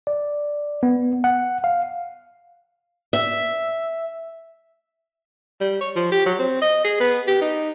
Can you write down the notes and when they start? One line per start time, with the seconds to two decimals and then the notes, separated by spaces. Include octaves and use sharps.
0.07 D5
0.83 B3
1.24 F#5
1.64 F5
3.13 E5
5.61 G3
5.81 C#5
5.96 F3
6.12 G4
6.26 F#3
6.39 C4
6.62 D#5
6.84 G#4
7.00 B3
7.27 G4
7.41 D#4